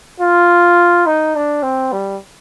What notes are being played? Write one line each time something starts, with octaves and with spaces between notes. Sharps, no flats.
F4
D#4
D4
C4
G3